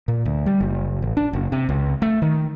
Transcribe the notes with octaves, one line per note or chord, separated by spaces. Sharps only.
A#2
D2
G3
F#1
A1
D4
F#1
C3
C#2
A3
D#3